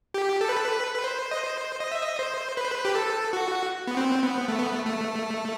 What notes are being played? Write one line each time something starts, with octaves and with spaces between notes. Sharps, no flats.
G4
A4
B4
A4
B4
B4
C5
D#5
C5
D#5
E5
D#5
C5
B4
C5
B4
G4
A4
F#4
B3
C4
B3
A3
B3
A3
A3